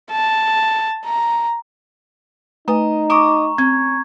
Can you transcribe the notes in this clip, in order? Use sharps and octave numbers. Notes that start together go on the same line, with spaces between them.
A5
A#5
A3 D#4 B4 D#5 G#5 A#5
D#5 A#5 C#6 D6
C4 C#4 G#6